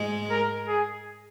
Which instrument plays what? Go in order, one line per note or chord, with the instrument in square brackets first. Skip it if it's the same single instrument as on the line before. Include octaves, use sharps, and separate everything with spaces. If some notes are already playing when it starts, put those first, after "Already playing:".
Already playing: [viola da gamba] G#2 G#3
[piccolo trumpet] A#4
G#4